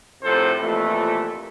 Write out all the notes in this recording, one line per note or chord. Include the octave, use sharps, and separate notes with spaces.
C2 A2 C3 F3 A4 C5
C2 F2 A#2 E3 A3